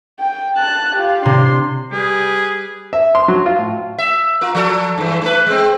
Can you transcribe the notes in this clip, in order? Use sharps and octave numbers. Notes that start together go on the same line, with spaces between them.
G5
A5 F#6
F4 G4
C3 D4 C6
G3 G#4 B4
E5
C6
F#3
F4
A2
E5
F4 A#4
F3 A4
G2 E3
A3 B4
G#3 C4